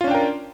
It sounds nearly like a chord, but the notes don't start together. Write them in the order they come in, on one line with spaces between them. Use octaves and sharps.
F4 C#4 D4 G5 A#4